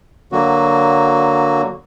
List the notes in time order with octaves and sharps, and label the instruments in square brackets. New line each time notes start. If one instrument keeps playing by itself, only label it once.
[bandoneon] D3 F#3 A#3 F#4